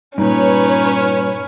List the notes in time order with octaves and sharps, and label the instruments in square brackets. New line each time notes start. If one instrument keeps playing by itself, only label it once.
[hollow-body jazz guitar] G2 A#2 [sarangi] C#4 [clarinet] D#4 [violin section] B4 C#5